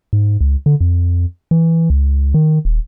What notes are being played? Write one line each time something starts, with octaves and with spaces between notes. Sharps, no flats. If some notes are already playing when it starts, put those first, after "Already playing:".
G#2
C#2
D3
F2
E3
C#2
D#3
D#1